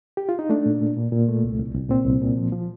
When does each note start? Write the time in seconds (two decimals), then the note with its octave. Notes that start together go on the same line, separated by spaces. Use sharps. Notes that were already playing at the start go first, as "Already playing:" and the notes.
0.17 G4
0.29 F4
0.39 D#4
0.50 A3 D4
0.66 A#2
0.82 A#2
0.97 A#2
1.12 A#2
1.28 A3
1.44 C2
1.59 C2
1.74 C2
1.90 A#2 C4
2.06 C2
2.21 A#2
2.37 F3
2.53 F3